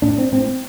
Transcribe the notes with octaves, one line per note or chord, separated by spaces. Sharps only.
A2 D4
C4
A2 C4